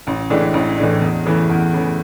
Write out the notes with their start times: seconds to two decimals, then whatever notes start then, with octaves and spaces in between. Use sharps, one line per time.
0.07 A1
0.30 A2 E3 G#3 D4
0.54 A1
0.78 A2 E3 G#3 D4
1.01 E2
1.25 C#3 E3 A3
1.49 E2
1.73 C#3 E3 A3